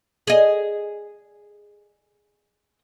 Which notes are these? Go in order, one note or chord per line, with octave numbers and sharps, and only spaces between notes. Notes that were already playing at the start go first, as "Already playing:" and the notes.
G#4 D#5